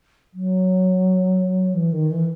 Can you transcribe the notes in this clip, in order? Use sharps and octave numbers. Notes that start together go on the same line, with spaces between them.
F#3
E3
D#3
E3